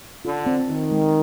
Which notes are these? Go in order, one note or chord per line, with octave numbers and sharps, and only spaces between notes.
D3 F4
C4
D#3 A#4
G#3